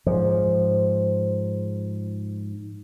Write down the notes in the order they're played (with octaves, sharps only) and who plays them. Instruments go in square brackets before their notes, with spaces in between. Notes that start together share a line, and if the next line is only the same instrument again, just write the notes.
[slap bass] G#2 F3